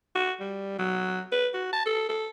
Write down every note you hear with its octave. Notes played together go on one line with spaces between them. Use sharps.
F#4
G3
F#3
B4
F#4
A5
A4
A4